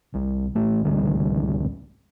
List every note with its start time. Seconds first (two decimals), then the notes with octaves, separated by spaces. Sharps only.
0.14 C2
0.55 A1 A3
0.85 G#1 C#2 D3 G3